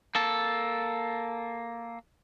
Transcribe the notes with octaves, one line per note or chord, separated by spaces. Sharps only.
A#3 A4